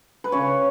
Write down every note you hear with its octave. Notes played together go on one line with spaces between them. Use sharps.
B4
C#3 C#5